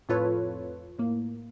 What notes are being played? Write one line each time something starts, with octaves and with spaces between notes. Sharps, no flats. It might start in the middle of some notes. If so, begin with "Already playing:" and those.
F2 A2 F4 A4 B4 C#5
A2 A#3